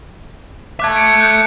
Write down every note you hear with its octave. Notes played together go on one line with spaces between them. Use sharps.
E5 A5 D6 F#6 G#6
G#6 C#7 D7
F#6 G6 D7